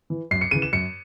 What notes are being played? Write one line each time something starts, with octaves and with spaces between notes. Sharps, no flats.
E3
F#2 C7
C#7
C#3 E3 D#7
E7
F#2 C#7